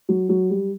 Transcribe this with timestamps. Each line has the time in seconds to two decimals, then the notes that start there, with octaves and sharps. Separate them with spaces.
0.09 F#3
0.29 F#3
0.50 G3